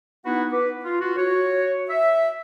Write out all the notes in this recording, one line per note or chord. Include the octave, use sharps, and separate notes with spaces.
B3 D#4 E4 F#4 B4 F#5
B4 D6
F4
F4 F#4
F#4 C#5
E5